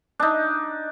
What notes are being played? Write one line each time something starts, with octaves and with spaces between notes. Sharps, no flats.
D4 D#4